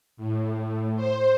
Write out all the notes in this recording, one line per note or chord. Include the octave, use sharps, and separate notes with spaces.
A2
C5